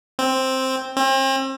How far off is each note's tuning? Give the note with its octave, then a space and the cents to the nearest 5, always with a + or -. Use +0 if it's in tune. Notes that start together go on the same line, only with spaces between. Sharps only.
C4 +5
C4 +40